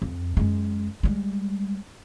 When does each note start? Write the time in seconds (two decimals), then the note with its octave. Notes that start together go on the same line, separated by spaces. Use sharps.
0.02 F2
0.37 F#2 G#3
1.03 G3 G#3